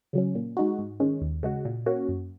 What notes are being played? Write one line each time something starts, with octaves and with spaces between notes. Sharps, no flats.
C#3 F#3 C#4
A#2
G#3 D#4 F#4
G#2
D#3 G#3 C#4
D#2
C#3 G#3 F#4
A#2
A#3 C#4 F#4
F#2